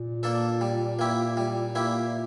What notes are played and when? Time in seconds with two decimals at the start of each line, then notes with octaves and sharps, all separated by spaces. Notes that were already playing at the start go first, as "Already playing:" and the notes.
Already playing: A#2
0.23 A#3 D4 A4
0.61 G3
0.99 A#3 E4 G4
1.37 G3
1.75 A#3 E4 G4